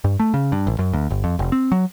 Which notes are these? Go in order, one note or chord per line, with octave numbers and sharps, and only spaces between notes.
G2
A3
C#3
G2
A1
F#2
D2
G1
F2
F1
C4
F#3